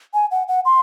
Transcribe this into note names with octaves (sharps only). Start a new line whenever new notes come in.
G#5
F#5
F#5
C6